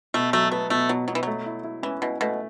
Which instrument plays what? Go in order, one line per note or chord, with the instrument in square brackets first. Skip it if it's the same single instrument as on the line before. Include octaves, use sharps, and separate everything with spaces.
[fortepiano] B2 [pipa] A3
[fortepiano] F#3 [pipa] A3
[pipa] A3 [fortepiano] B3
[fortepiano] B2 [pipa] A3
[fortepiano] B2 [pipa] F#3
[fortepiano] B2 [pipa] F#3
[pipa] E3
[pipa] F#3 [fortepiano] A3
[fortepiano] E4
E4
[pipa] E3 [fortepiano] C#4
[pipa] B2 [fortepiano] E4
[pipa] B2 [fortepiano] A3